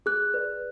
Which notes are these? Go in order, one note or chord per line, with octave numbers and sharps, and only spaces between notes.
G#4 F#6
B4 D5